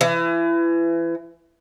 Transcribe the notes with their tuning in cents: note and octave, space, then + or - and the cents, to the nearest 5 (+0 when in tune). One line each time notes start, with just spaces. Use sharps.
E3 +30